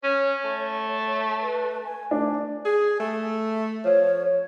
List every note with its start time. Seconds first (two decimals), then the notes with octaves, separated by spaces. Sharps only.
0.04 C#4 C#5
0.44 A3
1.41 B4
1.84 G#5
2.11 A3 D4
2.65 G#4
3.00 A3
3.85 F3 C#5